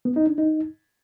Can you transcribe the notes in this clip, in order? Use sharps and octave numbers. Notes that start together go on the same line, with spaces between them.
B3
D#4
D4
D#4